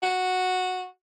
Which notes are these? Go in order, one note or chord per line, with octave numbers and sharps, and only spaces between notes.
F#4